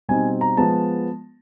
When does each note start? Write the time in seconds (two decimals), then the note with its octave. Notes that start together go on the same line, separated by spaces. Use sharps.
0.08 B2 G3 C4 D#4 G#5
0.41 A#5
0.57 F3 G#3 B3 A5